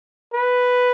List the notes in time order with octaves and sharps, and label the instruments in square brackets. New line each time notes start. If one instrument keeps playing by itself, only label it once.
[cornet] B4